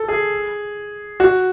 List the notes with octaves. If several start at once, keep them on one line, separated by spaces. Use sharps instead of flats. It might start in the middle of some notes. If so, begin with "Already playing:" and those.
Already playing: A4
G#4
F#4